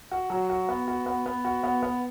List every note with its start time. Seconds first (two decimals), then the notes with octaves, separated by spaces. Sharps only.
0.11 F#4
0.30 F#3
0.50 F#4
0.69 B3
0.88 F#4
1.06 B3
1.26 B3
1.44 F#4
1.63 B3
1.83 B3